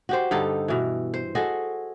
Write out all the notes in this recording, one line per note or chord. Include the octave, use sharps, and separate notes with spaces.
F#4 G4 C5
G2 D3 D#4 A4
B2 E3
C5
F#4 G#4 A4 D#5